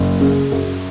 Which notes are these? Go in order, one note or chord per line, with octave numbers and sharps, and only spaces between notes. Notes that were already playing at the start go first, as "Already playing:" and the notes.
Already playing: F#1
C#3
F#2